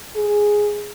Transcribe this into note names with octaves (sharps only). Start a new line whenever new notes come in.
G#4